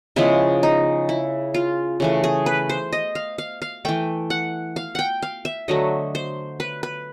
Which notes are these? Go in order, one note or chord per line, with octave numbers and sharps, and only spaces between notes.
C#3 F3 G#3 B3 E4
D#4
E4
F4
C#3 E3 A3
G#4
B4
C5
D#5
F5
F5
F5
E3 A3 G5
F#5
F5
F#5 G5
F5
E5
D3 F#3 A3 D#5
C5
B4
B4